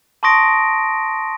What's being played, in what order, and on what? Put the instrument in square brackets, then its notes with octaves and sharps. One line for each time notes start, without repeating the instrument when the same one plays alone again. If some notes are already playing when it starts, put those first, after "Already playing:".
[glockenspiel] A5 C6 C#6 D#6 A#6 D7